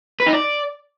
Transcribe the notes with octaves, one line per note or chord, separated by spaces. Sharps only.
B4
D#4
D5